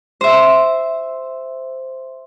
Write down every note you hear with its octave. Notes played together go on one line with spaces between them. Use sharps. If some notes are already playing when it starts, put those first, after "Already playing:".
C5 E5